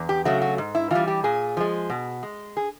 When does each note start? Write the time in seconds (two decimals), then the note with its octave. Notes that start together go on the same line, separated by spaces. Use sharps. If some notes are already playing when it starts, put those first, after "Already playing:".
Already playing: E2
0.09 G4
0.25 C#3 F#3 A3 F#4
0.42 F#4
0.58 G#2
0.75 E4
0.91 E3 G3 F4
1.08 G4
1.24 A#2 G#4
1.57 F3 G#3
1.90 B2
2.23 G#3
2.57 G#4